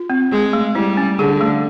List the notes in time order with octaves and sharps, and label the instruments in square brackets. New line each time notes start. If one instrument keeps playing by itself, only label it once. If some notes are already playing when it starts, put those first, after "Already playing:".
Already playing: [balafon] F4
C4
[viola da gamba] G#3 [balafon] G#4
[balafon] A3
[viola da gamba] G3 [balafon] E4
[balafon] C#4
[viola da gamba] D3 [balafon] G#4
[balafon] A3